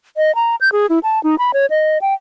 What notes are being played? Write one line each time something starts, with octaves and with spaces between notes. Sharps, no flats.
D#5
A#5
G6
G#4
E4
A5
D#4
B5
C#5
D#5
G5